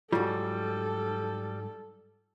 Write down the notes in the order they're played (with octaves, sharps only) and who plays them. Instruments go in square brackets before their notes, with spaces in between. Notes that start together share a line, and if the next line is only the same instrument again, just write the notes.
[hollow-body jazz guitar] G#2 F#3 [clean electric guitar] G3 [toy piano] F4 [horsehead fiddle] A4